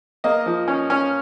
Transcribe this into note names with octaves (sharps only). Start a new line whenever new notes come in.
A#3 D#5
F3
C#4
C#4